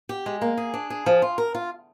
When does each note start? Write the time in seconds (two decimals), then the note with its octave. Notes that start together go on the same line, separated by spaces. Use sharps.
0.09 G4
0.26 G#3
0.42 A#3
0.57 G#4
0.74 D4
0.90 G#4
1.06 F3
1.22 F4
1.38 A#4
1.55 F4